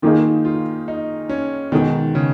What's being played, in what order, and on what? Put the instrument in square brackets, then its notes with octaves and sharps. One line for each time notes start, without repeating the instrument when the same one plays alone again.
[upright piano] D#3 A#3 D#4 G#4 [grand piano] F4
[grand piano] F4
D#4
C#4
[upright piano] B2 G#3 D#4 G#4 [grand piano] D#3
[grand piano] C#3